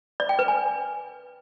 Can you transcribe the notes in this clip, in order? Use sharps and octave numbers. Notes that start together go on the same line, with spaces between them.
D5
G5
B4
G#5